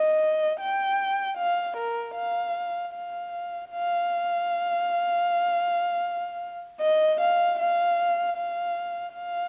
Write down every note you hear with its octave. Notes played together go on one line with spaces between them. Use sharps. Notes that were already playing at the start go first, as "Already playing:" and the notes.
Already playing: D#5
G5
F5
A#4
F5
F5
F5
D#5
F5
F5
F5
F5